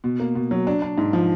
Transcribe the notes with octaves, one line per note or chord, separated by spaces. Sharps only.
B2
A#3
B2
F#3
D4
D4
G#2
F3